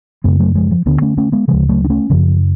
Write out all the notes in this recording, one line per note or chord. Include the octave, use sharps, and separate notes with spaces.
F#2 C#3 G#3 B3
F#3 A3
F3 G#3
F3
D2 D3 B3 D4
A3 C#4
A3 C#4
G#3 B3
D2 C#3 F3 G#3
F#3 A3
D4
A3 C#4
F#2 C#3 F3